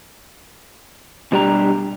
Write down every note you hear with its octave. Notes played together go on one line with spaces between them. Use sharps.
B2 G3 D4 G4 A#5